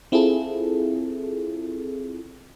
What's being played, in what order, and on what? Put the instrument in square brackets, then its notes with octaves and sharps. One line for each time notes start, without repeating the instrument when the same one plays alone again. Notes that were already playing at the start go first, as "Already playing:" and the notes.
[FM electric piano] C4 E4 F4 G#4 A4